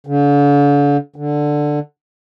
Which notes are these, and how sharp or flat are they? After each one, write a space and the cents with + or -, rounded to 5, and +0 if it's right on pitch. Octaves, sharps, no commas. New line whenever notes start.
D3 -40
D3 +5